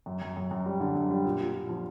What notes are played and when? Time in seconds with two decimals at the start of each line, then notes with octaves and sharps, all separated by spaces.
0.06 F#2
0.22 F#2
0.37 F#2
0.51 F#2
0.66 G3
0.80 D3
0.96 F#2
1.11 G3
1.25 A#2
1.40 A#2
1.55 A#2
1.69 F3